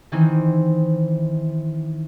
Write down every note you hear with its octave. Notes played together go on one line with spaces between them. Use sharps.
D#3 E3 C4